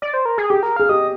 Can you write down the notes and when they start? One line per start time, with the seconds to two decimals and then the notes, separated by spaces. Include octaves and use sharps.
0.02 D5
0.14 C5
0.25 A#4
0.38 G#4
0.50 G4 G#4
0.63 A#4
0.76 G#4 F5
0.89 G4 D#5